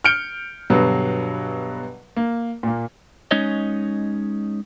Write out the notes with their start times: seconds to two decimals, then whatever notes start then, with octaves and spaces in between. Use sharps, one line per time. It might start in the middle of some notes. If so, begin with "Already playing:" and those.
0.04 F6 G6 C#7 D7 G7
0.70 G2 B2 D3 F#3 G3
2.16 A#3
2.63 A#2 A#3
3.31 G#3 C#4 D#4 C#5 D#5